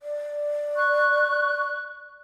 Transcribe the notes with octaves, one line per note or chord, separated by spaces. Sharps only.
D5
C#6 F#6